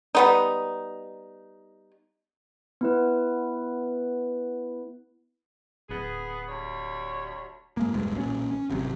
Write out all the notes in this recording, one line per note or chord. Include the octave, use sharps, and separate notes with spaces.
G3 B3 D#4
B3 E4 B4
D1 B3 G#4
D2 G3 C#5
G#2 G#3 A#3
E1 B1 G2 G#3
B1 A#2 E3 C#4
C#4
G#1 C3 D#3 F#3